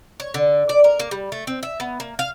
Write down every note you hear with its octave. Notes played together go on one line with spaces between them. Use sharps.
C#5
D3
D5
A#4
A#3
G3
A3
C4
E5
B3
A#3
F5